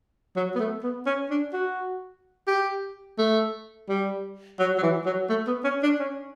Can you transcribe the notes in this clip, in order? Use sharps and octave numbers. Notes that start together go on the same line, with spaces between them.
F#3
B3
A3
B3
C#4
D4
F#4
G4
A3
G3
F#3
F#3
E3
F#3
A3
B3
C#4
D4
C#4